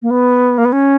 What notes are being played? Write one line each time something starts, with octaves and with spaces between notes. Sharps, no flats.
A#3
B3
A#3
B3
C#4